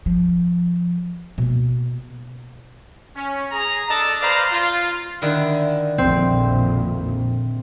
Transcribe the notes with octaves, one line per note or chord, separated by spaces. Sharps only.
F3
B2 A#3
C#4
G#4 A#5
D4 A4 D#5 A5
B4 C5 D5 F5 A#5
F4
D3 D#3 E4
A#1 F2 A#2 C4